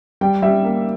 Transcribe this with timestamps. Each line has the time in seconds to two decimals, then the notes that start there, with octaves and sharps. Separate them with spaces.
0.21 G3 G5
0.42 G3 E5
0.64 A#3